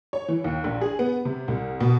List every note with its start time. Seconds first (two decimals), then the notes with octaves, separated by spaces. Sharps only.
0.13 C#5
0.28 E3
0.44 D#2
0.64 A#1
0.81 G#4
0.99 B3
1.25 C3
1.48 C2
1.81 B2